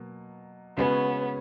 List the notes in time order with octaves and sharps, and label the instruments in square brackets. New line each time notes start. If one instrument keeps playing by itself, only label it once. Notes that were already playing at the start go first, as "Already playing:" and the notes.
Already playing: [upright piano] B2 F#3 A#3
[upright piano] C#3 G#3 C#4 F#4 C#5 [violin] B3